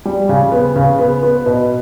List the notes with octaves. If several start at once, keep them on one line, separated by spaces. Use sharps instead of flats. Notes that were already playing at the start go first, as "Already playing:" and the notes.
G3
C#3
B3
C#3
B3
B3
B2